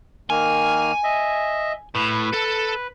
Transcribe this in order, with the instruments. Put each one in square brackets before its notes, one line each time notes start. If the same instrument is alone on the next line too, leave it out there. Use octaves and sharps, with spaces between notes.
[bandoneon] D#3 A#3 F6 [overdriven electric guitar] G#5
[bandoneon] D#5 E5
[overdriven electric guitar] A2 [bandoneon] B4
[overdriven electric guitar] A4